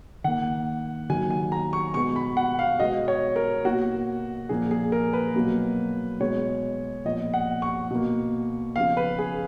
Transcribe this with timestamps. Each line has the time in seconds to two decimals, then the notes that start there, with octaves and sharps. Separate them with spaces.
0.24 D#3 A#3 F#5
1.10 D#3 F#3 A#3 G#5
1.30 G#5
1.52 A#5
1.73 C#6
1.94 B2 G#3 B3 C#6
2.16 B5
2.37 F#5
2.59 F5
2.80 B2 G#3 B3 D#5
3.08 C#5
3.36 A#4
3.65 B2 A#3 F#4
4.49 A#2 F3 A#3 G#4
4.71 G#4
4.92 A#4
5.13 B4
5.34 B2 F#3 A#3
6.20 B2 G#3 B3 C#5
7.05 A#2 F3 B3 D#5
7.34 F#5
7.62 C#6
7.91 B2 A#3
8.75 C#3 F3 B3 F5
8.97 B4
9.19 G#4